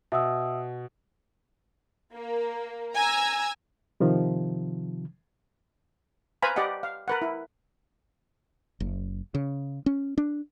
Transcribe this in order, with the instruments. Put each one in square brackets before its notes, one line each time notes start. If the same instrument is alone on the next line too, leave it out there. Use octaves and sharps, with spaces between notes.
[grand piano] B2 [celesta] E5 D#6 E6
[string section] A#3
G#5 A#5 E6
[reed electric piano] C3 D#3 F3
[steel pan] B4 C5 F5 G#5 A#5 B5
G4 D5 D#5 F#5
F5
A#4 B4 F#5
E4
[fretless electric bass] F#1
C#3
C#4
D4